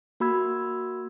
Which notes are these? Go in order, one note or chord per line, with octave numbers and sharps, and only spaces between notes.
A#3 F#4 B5 E6 G#6